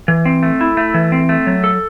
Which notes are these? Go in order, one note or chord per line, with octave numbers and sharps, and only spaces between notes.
E3
C4
A3
E4
A3
E3
C4
A3
F#3
A4